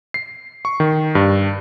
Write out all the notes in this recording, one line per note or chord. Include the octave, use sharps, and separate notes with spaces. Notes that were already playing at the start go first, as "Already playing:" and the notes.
C7
C#6
D#3
G2